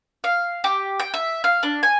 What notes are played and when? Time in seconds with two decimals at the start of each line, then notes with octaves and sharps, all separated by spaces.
0.24 F5
0.64 G4
1.00 G5
1.14 E5
1.44 F5
1.63 D4
1.83 G#5